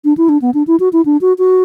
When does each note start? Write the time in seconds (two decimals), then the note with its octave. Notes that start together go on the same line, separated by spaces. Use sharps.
0.05 D4
0.17 E4
0.29 D4
0.42 B3
0.54 D4
0.67 E4
0.80 F#4
0.93 E4
1.05 D4
1.21 F#4
1.39 F#4